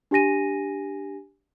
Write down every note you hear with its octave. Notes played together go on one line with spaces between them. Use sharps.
D4 G4 G#5 A#6 D#7